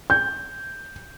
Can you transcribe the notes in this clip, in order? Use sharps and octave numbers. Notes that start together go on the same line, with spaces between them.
G6